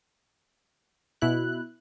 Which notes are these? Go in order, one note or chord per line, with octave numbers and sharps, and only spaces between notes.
B2 E4 F#6